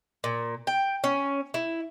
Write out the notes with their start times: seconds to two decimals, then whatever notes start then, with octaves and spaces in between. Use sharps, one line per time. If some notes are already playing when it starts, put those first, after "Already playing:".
0.24 A#2
0.67 G5
1.04 C#4
1.54 E4